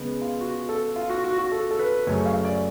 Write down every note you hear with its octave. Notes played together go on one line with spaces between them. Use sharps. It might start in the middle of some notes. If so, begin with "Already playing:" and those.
Already playing: C#3 G#3 B3
F4
F#4
A4
F4
F#4
F#4
F#4
A4
A4
B4
F#2 C#3 F#3 A3 C#4 C#5
F5
D5